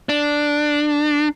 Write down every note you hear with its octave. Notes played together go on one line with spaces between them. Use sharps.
D4